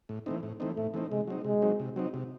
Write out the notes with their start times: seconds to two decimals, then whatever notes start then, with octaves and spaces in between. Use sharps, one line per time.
0.09 A2
0.26 E3 A3 C4 D#4
0.43 A2
0.60 E3 A3 C4 D#4
0.76 A2 A3
0.94 E3 A3 C4 D#4
1.11 C3 G#3
1.27 F#3 C4 D#4
1.45 C3 G#3
1.62 F#3 C4 D#4
1.80 C3
1.96 F#3 C4 D#4
2.14 C3